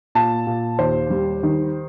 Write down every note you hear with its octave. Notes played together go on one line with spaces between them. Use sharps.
A#2 A5
A#2
D#2 C5
G3
D#3